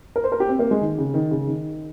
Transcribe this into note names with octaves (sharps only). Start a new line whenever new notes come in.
A#4
C5
A#4
G4
C4
A#3
G#3
D#3
C#3
D#3
C#3
D#3